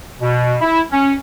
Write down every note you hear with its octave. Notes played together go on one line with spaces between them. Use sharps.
B2
E4
C#4